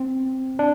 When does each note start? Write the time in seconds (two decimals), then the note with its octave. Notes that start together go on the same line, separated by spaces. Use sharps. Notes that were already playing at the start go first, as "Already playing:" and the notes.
Already playing: C4
0.59 D4